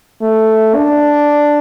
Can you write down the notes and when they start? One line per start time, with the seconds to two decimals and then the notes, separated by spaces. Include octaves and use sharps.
0.22 A3
0.76 D4